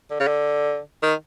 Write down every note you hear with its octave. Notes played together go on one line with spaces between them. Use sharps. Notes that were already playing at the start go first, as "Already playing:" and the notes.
D3
C#3
D3
D#3